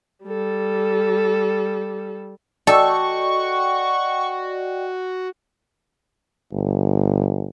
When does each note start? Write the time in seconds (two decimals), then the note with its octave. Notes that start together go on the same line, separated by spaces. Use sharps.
0.24 G3 A4
2.67 F#4 A4 D5 D#5 G5 C#6
6.52 G1